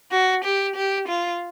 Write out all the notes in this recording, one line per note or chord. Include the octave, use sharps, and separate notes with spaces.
F#4
G4
G4
F4